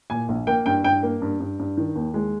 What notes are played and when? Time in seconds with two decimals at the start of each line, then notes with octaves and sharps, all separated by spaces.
0.10 A#2 G#5
0.29 A#1
0.47 A#3 G5
0.66 G2 G5
0.84 G2 G5
1.03 A#3
1.22 G2
1.40 G2
1.59 G2
1.77 D#3
1.96 D#2
2.14 G#3